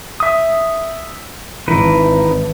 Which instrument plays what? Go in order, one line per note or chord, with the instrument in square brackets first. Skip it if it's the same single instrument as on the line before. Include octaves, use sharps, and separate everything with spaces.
[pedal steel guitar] E5 D#6
[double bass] G#1 [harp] E3 [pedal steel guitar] D#4 E4 B4